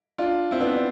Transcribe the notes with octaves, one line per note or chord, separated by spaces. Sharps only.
D4 F4
C4 E4
B3 D4
D4